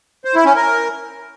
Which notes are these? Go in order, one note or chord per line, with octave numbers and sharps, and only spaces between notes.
C5
E4
C#4
A#4